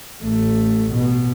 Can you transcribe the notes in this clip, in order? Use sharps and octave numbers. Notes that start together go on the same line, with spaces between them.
A1 A3
B2